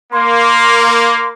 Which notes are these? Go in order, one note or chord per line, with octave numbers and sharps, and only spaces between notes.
A#3 C6